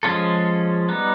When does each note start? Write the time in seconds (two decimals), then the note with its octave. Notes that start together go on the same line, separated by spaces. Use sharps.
0.03 F3 G#3 C#4 F4 A4
0.89 G3 B3 D#4